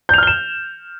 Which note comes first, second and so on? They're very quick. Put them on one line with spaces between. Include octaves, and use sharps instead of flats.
G6 F7 F6 G7 E7